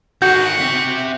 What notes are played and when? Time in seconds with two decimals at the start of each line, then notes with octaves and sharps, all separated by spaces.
0.22 D#3 F#4 G#4 F#5 G6
0.60 C4 E5